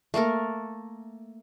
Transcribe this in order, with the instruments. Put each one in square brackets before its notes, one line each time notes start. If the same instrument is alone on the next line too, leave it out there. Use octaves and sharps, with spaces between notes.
[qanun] A3 A#3 A4 A#4